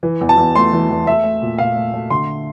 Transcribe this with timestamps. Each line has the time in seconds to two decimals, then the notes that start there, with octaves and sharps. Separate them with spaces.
0.03 E3
0.21 E2
0.29 A5
0.37 E2
0.55 A3 C6
0.73 E3
0.90 E2
1.06 A3 E5
1.24 A3
1.42 A#2
1.58 A#2 F5
1.76 A3
1.94 A3
2.10 D3 C6